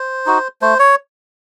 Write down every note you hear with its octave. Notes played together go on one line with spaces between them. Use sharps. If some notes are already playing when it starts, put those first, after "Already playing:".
Already playing: C5
D#4 F#4
A3 C5
C#5